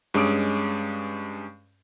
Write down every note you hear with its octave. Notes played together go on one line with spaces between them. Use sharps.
G2 G#3 C#4 D6 D#6 D7